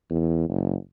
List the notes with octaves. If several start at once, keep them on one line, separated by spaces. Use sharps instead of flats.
E2
F#1